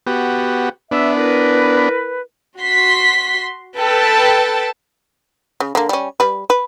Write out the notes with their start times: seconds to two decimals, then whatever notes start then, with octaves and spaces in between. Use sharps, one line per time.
0.07 B3 F#4 G4
0.91 B3 D4 E5
1.15 E4 A#4 B4
2.59 F#4 C6 B6
3.79 A4 B4 G5 A5
5.60 C#3
5.75 D3 A#3
5.89 G3 C#4
6.20 G3 B4
6.50 B4